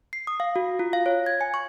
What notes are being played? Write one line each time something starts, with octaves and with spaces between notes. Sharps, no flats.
C7
D#6
F5
F#4
F4
F5
C#5
G#6
G#5
C#6